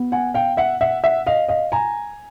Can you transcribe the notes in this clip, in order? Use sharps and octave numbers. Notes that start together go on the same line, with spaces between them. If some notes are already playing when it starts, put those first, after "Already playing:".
Already playing: B3
F#5 G#5
F5 G5
E5 F#5
E5 F#5
E5 F#5
D#5 F5
D#5 F5
G#5 A#5